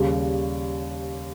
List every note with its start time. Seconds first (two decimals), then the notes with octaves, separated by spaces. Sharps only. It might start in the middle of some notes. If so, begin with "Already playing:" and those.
Already playing: D#2 C#3 G3